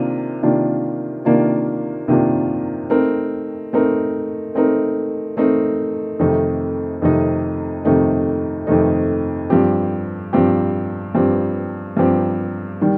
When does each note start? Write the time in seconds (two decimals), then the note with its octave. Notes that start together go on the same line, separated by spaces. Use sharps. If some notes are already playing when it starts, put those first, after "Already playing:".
Already playing: C3 D#3 A#3 D4 F4
0.42 C3 D#3 A#3 D4 F4
1.25 C3 D#3 A#3 D4 F4
2.08 C3 D#3 A#3 D4 F4
2.89 A3 C4 D#4 A#4
3.73 A3 C4 D#4 A#4
4.55 A3 C4 D#4 A#4
5.37 A3 C4 D#4 A#4
6.19 F2 C3 D#3 A3 D#4
7.02 F2 C3 D#3 A3 D#4
7.85 F2 C3 D#3 A3 D#4
8.67 F2 C3 D#3 A3 D#4
9.50 G2 F3 C4 G4
10.33 G2 F3 C4 G4
11.15 G2 F3 C4 G4
11.97 G2 F3 C4 G4
12.81 D#3 G3